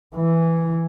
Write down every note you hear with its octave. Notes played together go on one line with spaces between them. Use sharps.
E3